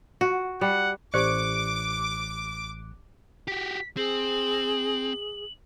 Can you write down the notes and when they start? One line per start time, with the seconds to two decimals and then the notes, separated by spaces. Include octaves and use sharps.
0.21 F#4
0.61 G3 F#5
1.14 A1 G4 C5 D5 D6 F#6 C#7
3.48 F#4 G4 B6
3.97 C4 G#4 F#7